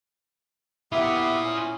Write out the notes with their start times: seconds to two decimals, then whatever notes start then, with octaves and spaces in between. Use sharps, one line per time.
0.92 B3 E4 F4 G4 A#4 E5 D#6
1.44 C#4